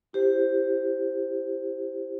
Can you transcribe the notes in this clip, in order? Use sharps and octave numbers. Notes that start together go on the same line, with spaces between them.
E4 G4 C5